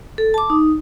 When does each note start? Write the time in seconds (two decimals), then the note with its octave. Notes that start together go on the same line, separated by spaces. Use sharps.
0.18 A4
0.34 A5 D6
0.50 D#4